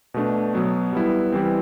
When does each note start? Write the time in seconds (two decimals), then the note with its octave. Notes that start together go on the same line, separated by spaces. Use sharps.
0.14 B2 A3 D4
0.54 B2 F#3 B3
0.93 G3 B3 E4
1.32 E3 G3 C4